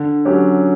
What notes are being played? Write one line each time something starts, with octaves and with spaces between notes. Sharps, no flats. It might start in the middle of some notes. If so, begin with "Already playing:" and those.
Already playing: D3
F#3 C#4 G4